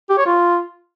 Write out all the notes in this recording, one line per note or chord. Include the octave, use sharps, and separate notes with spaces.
G4
C#5
F4